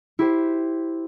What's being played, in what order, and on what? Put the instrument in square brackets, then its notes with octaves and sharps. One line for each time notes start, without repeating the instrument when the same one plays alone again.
[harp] E4 G4 C5